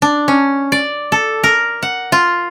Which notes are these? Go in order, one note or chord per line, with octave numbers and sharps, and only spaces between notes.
D4
C#4
D5
A4
A#4
F#5
F4